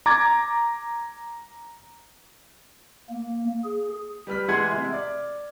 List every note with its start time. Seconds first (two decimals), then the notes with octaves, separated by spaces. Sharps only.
0.06 A#5 D6 G#6 A6
3.10 A#3
3.64 G#4
4.27 G3 B4 F6 B6
4.48 E3 G#3 G#4 F#5 C6 G#6
4.71 C3 G#3 E4
4.93 D5